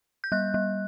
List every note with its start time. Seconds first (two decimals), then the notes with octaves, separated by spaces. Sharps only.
0.24 G6
0.32 G3 F#6
0.54 G3